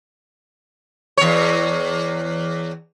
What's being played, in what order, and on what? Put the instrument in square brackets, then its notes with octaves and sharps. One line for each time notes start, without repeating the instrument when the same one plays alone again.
[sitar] E2 C#5